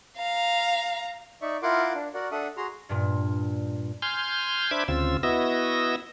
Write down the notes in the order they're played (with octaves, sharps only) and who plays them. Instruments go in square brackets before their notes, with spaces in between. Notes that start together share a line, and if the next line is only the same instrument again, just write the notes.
[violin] F5 A#5
[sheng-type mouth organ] D#4 D5 E5 C#6
E4 F4 A#4 F#5 C6 D6
D4
F#4 A#4 D5 F#5
D4 A4 E5 F#5 D#6
F#4 G#4 A#5 C6
[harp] G2 A#2
[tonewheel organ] G#5 C6 F6 G6
D4 C5 E5 B5 D6 G#6
D2 C#3 C4 F4 E6
B3 E4 F#4 D#5 E6 A#6